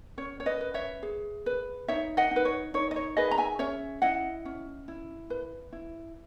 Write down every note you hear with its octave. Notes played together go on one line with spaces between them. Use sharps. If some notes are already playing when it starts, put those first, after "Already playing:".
C#4 C#5
C#5
B4 D#5
B4
C#5 E5
G#4
B4
D#4 C#5 E5
D#5 F#5
D#4 B4
C#5
D#4 C#5
D#5
C#5
G#4 B4 D#5
A#5
E5 G#5
C#4 C#5 E5
E4 D#5 F#5
C#4
E4
B4
E4